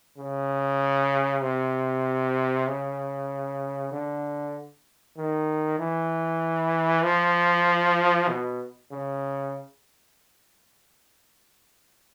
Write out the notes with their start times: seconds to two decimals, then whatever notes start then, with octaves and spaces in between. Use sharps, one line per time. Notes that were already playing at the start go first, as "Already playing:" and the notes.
0.18 C#3
1.42 C3
2.67 C#3
3.92 D3
5.17 D#3
5.79 E3
7.03 F3
8.28 B2
8.91 C#3